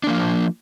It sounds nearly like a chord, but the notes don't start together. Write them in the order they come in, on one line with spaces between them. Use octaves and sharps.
D4 A#3 F3